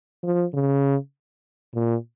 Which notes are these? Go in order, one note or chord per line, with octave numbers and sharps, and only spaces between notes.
F3
C#3
A#2